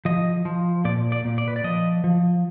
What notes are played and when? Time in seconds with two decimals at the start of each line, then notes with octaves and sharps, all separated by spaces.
0.05 F3 D#5
0.45 F3
0.85 A#2 D5
1.12 D5
1.25 A#2
1.38 D5
1.48 B4
1.56 D5
1.64 F3 D#5
2.04 F3